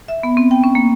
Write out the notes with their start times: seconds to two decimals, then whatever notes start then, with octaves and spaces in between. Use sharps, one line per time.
0.08 E5
0.23 B3
0.37 C4
0.51 G5
0.64 C#4
0.75 A#3